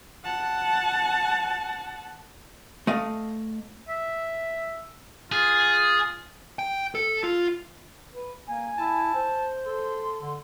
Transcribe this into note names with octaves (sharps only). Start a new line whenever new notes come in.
F#5 A5
A3 D#5 F5
E5
F4 G#4
G5
A4
F4
B4
A#3 G#5
E4 A5
C5
A4 C6
D3